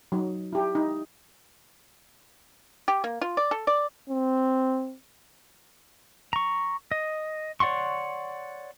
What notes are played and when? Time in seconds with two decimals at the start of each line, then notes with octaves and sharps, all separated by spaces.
0.12 F#3 D#4
0.53 E4 G4
0.75 D#4
2.88 G4
3.04 A#3
3.22 F4
3.37 D5
3.51 A4
3.67 D5
4.10 C4
6.33 A#5 C#6
6.91 D#5
7.60 C#5 D5 F#5 C6 C#6